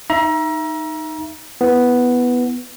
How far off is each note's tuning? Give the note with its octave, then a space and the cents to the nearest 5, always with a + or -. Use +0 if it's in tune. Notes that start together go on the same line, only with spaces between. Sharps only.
D#4 +0 E5 +20 A#5 +30
B3 +0 E4 +0